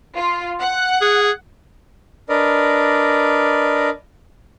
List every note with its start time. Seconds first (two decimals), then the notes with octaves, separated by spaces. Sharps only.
0.15 F4
0.58 F#5
1.01 G#4
2.29 D4 A#4 B4 D5 D#5